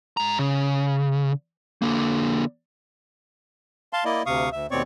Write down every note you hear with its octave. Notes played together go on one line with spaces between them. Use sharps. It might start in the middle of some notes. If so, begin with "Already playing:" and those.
G#2 A#5
C#3
D3 A#3
F5 A5 C6
A#3 E4 D5 D#5
D2 C3 F5 C#6 D#6
D2 E5
D#2 B2 C4 C#5 D5 C#6